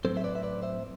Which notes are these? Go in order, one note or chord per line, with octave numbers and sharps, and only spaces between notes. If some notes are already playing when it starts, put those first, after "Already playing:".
A2 F#3 C4 A4 C5
E5
B4 D5
E5
B4 D5
C5 E5